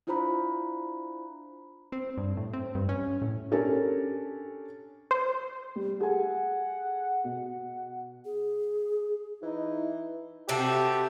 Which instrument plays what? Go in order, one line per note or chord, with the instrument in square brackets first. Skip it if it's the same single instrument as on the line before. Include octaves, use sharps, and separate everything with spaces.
[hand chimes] D4 E4 F4 C5 A#5 B5
[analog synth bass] C4
G2
A2
C4
G2
C#4
A2
[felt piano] C#4 D4 G4 A4 A#4
[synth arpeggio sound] C5
[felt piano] G3
[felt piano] G#4 A4 G#5 [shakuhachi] F#5
[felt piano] B2
[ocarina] G#4
[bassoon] E3 [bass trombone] D#4 [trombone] E4
[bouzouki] C3 C4 F#4 [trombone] G4 [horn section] A4 E5 A5